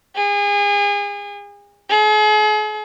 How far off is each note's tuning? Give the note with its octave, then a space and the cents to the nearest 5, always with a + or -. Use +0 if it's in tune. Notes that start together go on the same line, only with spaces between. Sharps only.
G#4 -35
G#4 +40